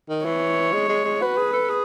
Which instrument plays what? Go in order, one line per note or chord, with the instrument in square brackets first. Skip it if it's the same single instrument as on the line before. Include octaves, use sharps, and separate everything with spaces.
[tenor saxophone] D#3
[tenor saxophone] E3 [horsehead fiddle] C#5
[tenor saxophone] G#3
G#3
G#3
[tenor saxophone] F#4 [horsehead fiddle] B4
[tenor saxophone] G#4
A4
G#4